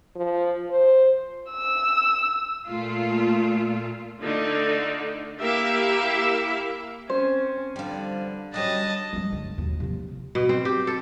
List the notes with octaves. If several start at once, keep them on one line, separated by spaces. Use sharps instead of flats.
F3
C5
E6
A#2 A3 F4
D3 A3 D4 D#4 F4
A#3 E4 G4 A#4 E5 F5
C4 C#4 C5
D3 F3 G3
F#3 G3 C#4 D#5 A5
G3 A3
D2 G2
D#2 B2
C3 F3
B2
C4
G4
A4